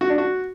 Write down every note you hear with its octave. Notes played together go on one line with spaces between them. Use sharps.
F#4
D4
F#4